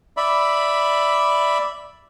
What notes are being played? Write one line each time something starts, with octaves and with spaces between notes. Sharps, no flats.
D5 E5 B5